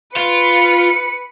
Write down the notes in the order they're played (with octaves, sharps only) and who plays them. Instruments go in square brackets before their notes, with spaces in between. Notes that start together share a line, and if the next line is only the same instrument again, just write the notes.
[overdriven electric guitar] F4 [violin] B4 C#7